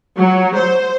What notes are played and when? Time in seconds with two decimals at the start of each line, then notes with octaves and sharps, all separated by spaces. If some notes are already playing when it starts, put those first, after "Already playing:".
0.19 F#3
0.58 C5